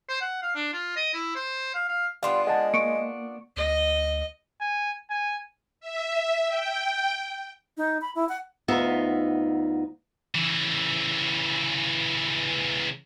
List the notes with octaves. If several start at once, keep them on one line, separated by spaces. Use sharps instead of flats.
C5
F#5
F5
D4
F4
D#5
E4
C5
F5
F5
G3 B3 D4 F4 F5 C6
G#3 F#5 A5
A#3 C#6 C#7 D7
D2 D#5
G#5
G#5
E5
G5
D#4
B5
E4
F#5
D2 B3 D#4 F4 E5
C#3 E3